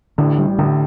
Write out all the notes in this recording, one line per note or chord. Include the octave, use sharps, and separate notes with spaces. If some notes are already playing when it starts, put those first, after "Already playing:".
A1 A2 D3
G3
A1 A2 D3